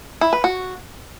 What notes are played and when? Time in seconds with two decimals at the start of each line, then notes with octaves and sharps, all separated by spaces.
0.21 E4
0.33 B4
0.44 F#4